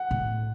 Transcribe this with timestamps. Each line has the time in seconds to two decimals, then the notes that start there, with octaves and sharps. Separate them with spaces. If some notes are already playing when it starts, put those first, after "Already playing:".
Already playing: F#5
0.11 A2